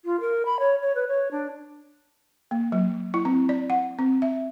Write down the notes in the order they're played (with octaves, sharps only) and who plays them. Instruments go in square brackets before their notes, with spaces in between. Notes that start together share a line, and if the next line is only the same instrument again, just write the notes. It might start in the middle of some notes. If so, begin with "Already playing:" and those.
[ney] F4
A#4
B5
C#5
C#5
B4
C#5
D4
[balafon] A#3
F#3
E4
C4
D5
F#5
C4
E5